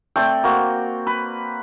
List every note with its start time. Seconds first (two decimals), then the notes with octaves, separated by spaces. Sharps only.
0.16 A3 C4 D5 G5
0.44 A#3 F#4 C5
1.07 B4